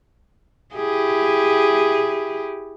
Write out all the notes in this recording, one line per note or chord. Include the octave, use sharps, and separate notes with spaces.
E4 G4 G#4